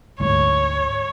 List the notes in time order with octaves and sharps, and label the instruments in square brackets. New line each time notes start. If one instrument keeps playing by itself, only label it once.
[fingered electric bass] D2 G#2 [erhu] C#5